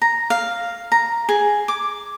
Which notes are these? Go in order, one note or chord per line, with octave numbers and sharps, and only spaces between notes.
A#5
F5
A#5
G#4
D6